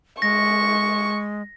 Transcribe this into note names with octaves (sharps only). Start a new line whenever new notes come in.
G#3 C#6 A#6